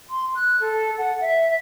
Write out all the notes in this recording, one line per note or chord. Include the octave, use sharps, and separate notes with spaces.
C6
F#6
A4
F#5
E5